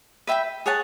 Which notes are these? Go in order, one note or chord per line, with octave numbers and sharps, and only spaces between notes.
B4 E5 G5 B5
G#4 C#5 F#5 A5